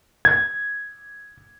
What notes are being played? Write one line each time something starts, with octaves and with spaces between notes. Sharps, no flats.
G#6